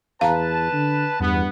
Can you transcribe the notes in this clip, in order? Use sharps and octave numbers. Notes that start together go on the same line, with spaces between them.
E2 B4 F5 A5 A#5
D3
E2 G2 B3